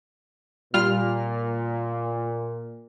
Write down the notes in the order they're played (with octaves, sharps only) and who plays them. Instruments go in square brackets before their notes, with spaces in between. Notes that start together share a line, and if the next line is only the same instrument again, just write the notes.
[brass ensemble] A#2 [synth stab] G3 F4 F6